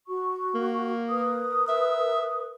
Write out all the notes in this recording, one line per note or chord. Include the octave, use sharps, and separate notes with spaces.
F#4 C#6
A#3
A#4 B4 D#6
E5